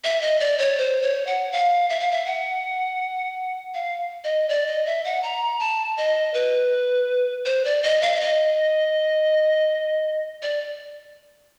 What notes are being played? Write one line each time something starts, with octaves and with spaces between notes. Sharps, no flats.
E5
D#5
D5
C#5
C5
C#5
F#5
F5
E5
F5
E5
F#5
F5
D#5
D5
D#5
E5
F#5
A#5
A5
D#5
B4
C5
D5
D#5
F5
E5
D#5
D5